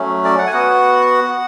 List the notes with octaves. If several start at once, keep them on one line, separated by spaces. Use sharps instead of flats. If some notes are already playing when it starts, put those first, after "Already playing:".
Already playing: F#3 A3 C#4
D5
F#5
G#5
B3 F#4 F#5